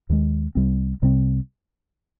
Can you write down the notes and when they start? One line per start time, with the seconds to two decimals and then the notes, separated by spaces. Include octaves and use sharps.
0.09 D#2 D#3 G#3
0.55 C2 C3 G3 C4
1.02 C2 C3 G3 C4